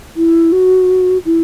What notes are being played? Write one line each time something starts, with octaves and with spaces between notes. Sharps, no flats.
E4
F#4
E4